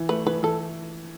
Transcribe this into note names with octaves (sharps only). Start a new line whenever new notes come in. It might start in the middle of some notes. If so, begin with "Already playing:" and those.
Already playing: E3
A3 B4
E3 B4
E3 A4